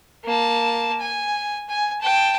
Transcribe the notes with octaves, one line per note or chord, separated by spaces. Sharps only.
A#3 A5
G#5
G#5
G5 A5